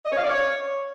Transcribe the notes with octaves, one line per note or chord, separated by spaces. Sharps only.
D#5
C#5
F5
D5
C#5